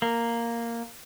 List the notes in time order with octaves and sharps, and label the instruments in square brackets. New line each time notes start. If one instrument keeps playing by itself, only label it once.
[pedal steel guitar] A#3